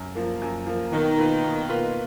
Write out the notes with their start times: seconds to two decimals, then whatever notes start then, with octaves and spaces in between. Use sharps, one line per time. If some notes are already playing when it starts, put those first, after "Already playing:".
Already playing: F#2
0.15 F3 A#3
0.42 F#2
0.67 F3 A#3
0.92 B2 D#3
1.17 A#3 F4 B4
1.44 B2
1.69 A#3 F4 B4